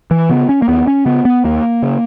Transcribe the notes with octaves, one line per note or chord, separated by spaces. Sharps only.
E3
C#3 B3
C#4
A#3
D#2 B3
C#4
C#3 B3
B3
D#2 A#3
C#3